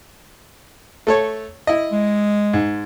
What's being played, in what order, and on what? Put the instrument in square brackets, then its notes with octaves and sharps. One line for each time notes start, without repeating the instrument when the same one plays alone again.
[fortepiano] A3 A4 C#5
E4 D#5
[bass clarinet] G#3
[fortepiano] G#2